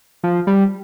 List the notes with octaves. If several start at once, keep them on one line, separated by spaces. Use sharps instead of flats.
F3
G3